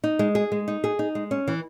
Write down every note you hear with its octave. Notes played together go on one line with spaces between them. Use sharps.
D#4
G#3
G#4
G#3
D#4
G#4
D#4
G#3
C#4
E3